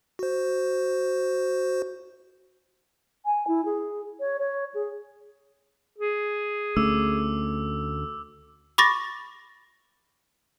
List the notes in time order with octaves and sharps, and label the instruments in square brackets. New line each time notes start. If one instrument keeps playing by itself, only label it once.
[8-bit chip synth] F#4 C5
[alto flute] G#5
E4
G#4
C#5
C#5
G#4
[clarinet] G#4
[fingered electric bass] D2 A3 C#4 [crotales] D6 E6
[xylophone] B5 C#6 D6 A6 A#6